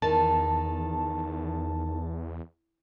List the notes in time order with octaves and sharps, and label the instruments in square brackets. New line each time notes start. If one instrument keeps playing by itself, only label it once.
[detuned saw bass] E2 [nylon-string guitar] D#3 [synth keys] A5